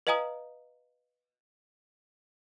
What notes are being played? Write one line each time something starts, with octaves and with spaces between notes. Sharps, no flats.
B4 D#5 F5 G#5 A#5 D#6